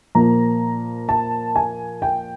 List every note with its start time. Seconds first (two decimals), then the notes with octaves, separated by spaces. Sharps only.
0.15 A#2 F3 A#3 A#5
1.09 A5
1.56 G#5
2.02 G5